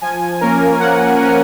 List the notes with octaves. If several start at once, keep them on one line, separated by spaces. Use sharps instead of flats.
F3 G#5
A#3 C#4 A#4
F3 F#5
A#3 C#4